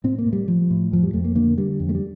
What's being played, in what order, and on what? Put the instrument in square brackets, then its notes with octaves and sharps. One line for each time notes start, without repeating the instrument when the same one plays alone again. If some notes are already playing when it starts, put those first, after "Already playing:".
[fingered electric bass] A2 C4
A#3
A2
G3
A2 F3
A2
F2 F3
G3
F2 A3
A#3
D3 A#3
D3 G3
F2
A3
G3